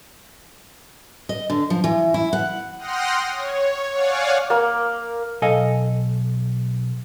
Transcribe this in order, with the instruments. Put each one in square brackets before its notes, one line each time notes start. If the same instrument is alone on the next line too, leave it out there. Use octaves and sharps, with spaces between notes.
[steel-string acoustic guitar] D#5
D3
F3
E3
E4
F#5
[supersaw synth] F#5 G5 C6 D#6 F6 A#6
C#5
C#5 D5 F5 F#5 G#5
[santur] A#3
[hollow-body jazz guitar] B1 A4 D#5 F5 G#5